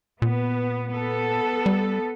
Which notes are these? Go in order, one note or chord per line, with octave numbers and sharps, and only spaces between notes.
A#2 B3
B3 A4
G3